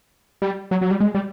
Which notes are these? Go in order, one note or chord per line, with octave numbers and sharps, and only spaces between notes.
G3
F#3
F#3
G3
G#3
G3